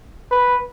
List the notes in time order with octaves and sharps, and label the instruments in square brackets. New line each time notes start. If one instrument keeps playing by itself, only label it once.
[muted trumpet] B4